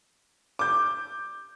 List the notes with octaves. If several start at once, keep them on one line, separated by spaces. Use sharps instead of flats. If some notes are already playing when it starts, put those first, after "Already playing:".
D6 G6